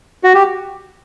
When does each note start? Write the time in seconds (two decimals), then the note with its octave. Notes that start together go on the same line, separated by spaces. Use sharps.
0.24 F#4
0.34 G4